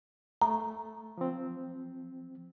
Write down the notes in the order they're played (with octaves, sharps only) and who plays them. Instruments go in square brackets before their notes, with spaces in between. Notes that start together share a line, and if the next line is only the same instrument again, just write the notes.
[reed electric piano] A3 [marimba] A#5
[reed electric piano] F3 C4